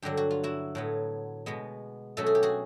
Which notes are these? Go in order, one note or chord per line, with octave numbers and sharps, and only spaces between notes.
G2 D3 F#3 G4
F#4
F4
E4 F#4
A2 F#3 B3
B2 G#3 B3
B2 F#3 A3 C#4 A4
G#4
G4
F#4 G#4